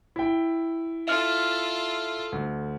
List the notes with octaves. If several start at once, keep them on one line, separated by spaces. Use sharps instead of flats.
E4 G5
F4 A4 E5 F6
D2